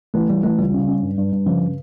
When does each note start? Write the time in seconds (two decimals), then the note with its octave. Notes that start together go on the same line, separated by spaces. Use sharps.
0.14 E3 A3
0.29 E3 G3
0.44 E3 A3
0.58 C#2 G3
0.74 C#3
0.88 C#4
1.02 G2
1.17 G2
1.32 G2
1.46 C#3 F3
1.61 C#3